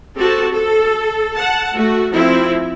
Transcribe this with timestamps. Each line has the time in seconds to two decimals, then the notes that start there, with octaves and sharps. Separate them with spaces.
0.17 C4 F#4 G4 A4 A5
0.52 A4
1.35 F#5 A5
1.71 A3 F#4
2.14 F3 C4 E4